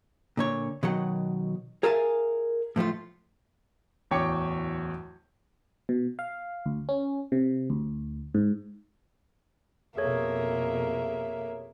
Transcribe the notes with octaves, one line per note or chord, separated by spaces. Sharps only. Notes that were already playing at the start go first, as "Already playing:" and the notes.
A#2 D3 C#5
B2 D#3 F#3 F#5
G#4 A#4 E5 F5 G#5 A5
A2 F3 A3 F4
D1 E2 C#5 G5 D6 C#7
B2
F5
D2
C#4
C3
D2
G#2
F2 B2 A#3 G#4 A4 C#5 E5